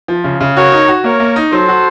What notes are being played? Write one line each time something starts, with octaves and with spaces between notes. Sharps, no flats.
F3
C#3
C#3
F#4 A#4 C#5
D#4
F#4
A#3 A#4 C#5
A#3
D#4
F#3 A4 C5
F#4